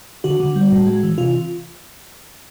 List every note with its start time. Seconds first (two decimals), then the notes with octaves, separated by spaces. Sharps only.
0.24 D3 F#4
0.40 D3
0.56 G3
0.72 A2
0.87 G#3
1.03 E3
1.18 C3 F4